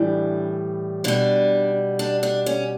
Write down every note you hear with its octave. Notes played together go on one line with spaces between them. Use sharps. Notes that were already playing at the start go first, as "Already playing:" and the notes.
Already playing: A2 E3 G3 D4
B2 G3 D4
D4
D4
C#4